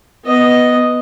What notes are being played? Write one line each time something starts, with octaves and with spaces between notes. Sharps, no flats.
B3 D#5